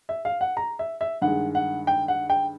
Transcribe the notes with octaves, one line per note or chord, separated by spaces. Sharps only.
E5
F5
F#5
A#5
E5
E5
G2 D#3 G#3 F#5
F#5
G5
F#5
G5